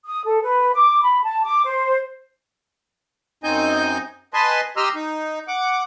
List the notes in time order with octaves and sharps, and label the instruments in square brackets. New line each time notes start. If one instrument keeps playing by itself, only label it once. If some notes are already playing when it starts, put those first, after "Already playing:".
[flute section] D#6
A4
B4
D6
B5
A5
D6
C5
[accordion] F#2 C4 D#4 D#5 G#5 G6
B4 D#5 G#5 A5 C6
G4 D#5 A#5 C6 E6 F6
D#4
F#5 D6